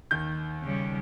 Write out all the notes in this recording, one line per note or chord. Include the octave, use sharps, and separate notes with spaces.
D#2 D#3 G6
C#3 G3